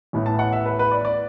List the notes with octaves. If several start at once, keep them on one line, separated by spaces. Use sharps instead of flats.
A1 A2 E3 B3
A5
F#5
E5
B4
B4
D5
D5